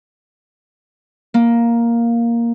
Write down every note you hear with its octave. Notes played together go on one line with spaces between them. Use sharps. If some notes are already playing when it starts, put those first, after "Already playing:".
A#3